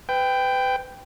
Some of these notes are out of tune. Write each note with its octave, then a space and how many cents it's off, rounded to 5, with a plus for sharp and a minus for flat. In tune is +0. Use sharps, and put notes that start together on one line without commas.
B4 +35 G5 +5